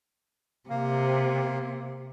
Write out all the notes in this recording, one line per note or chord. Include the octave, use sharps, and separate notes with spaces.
C3 A#3